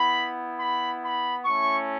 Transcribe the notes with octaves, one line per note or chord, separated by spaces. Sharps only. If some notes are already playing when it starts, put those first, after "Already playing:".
Already playing: B3 E4 B5
B5
B5
A3 C#4 E4 C#6